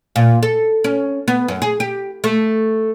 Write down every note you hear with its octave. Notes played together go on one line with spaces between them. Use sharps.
A#2
A4
C#4
B3
F#2
G#4
G4
A3